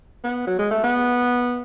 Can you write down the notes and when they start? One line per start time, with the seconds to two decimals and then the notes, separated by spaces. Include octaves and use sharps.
0.24 B3
0.47 F#3
0.59 G#3
0.71 A3
0.84 B3